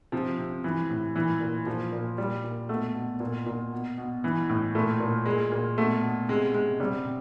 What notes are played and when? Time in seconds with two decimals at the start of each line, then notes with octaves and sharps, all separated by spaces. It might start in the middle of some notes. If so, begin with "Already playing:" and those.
0.12 C3 F3
0.38 C3
0.64 E3
0.90 A2
1.15 A#2 E3
1.41 A#2
1.66 A#2 F3
1.93 A#2
2.18 A#2 G3
2.44 A#2
2.69 B2 A3
2.95 B2
3.20 A#2
3.46 A#2
3.72 B2
3.98 B2
4.24 E3
4.49 A2
4.75 A#2 A3
5.00 A#2
5.26 A#2 G#3
5.52 A#2
5.77 B2 A3
6.03 B2
6.28 C3 G#3
6.54 C3 G#3
6.80 C3 G3
7.05 C3